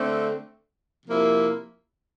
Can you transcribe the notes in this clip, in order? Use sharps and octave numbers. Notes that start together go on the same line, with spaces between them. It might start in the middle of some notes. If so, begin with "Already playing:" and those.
Already playing: D3 A3 C4
C3 F3 A#3 E4